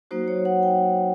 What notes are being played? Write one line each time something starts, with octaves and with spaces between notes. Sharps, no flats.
F#3 A#3 D#4 F#4 C5
C#5
F#5
G5